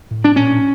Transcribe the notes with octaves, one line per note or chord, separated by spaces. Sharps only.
A2
D4
A#2 C#4